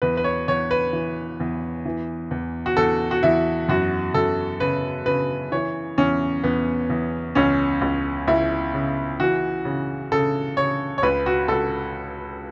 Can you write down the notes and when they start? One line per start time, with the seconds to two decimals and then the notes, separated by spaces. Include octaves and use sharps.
0.02 E2 B4
0.17 B4
0.24 C#5
0.48 E2 C#5
0.71 B4
0.93 E3
1.40 E2
1.85 E3
2.31 E2
2.66 F#4
2.77 E2 A4
3.11 F#4
3.23 E2 E4
3.68 F#2 F#4
4.14 F#2 A4
4.60 C#3 B4
5.06 C#3 B4
5.52 E3 C#5
5.98 E2 C#4
6.44 E2 B3
6.90 E2
7.35 C#2 C#4
7.82 C#2
8.27 C#2 E4
8.74 C#3
9.20 E3 F#4
9.65 C#3
10.12 C#3 A4
10.57 C#3 C#5
10.98 C#5
11.03 C#2 B4
11.26 F#4
11.48 C#2 A4